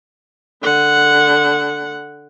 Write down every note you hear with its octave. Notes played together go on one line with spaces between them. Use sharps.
D3 F#5